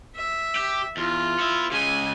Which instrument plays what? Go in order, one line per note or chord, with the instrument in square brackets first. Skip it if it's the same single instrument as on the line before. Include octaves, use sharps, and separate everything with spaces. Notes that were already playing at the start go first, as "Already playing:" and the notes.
[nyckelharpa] E5
[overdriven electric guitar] G4
[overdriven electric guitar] E2 [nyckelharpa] F4
[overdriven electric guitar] B3 E4
[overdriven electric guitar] C#3 G#3 [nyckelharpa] G#5